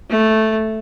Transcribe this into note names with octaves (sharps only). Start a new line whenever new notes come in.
A3